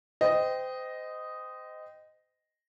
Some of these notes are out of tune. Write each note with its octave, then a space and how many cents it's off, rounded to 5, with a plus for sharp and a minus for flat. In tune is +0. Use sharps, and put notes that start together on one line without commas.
C5 -30 D#5 +0 G5 +0